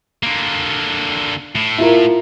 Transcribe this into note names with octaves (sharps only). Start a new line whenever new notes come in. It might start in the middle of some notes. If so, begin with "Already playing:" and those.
D3 A#3
A2
E4 F4 A#4